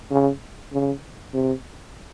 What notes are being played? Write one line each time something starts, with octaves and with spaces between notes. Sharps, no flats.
C#3
C#3
C3